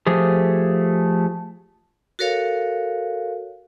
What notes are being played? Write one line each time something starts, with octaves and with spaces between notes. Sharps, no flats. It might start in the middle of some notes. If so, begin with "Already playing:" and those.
F3 A3 G4 G#4
F#4 A4 A#4 C#5 F5